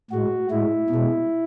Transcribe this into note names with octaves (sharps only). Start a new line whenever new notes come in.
A2 G#3 F#4
A2 G#3 E4
B2 G#3